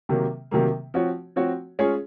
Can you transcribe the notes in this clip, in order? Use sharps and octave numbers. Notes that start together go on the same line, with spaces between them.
C3 D#3 F#3 A#3
C3 D#3 F#3 A#3
F3 C4 F#4 C#5
F3 C4 F#4 C#5
G#3 C#4 F4 G#4 C#5